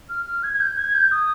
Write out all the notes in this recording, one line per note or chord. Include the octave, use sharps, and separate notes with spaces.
F6
F6
G#6
G#6
G6
G#6
G6
D#6